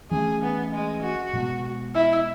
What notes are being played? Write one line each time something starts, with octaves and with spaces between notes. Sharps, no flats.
E3 A3 C#4 G#4
B3
G#3
F#4
B2 G#3 B3
E4